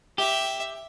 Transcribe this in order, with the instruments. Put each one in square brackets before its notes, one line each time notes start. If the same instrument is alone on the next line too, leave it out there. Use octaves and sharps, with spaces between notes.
[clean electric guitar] G4 [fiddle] E5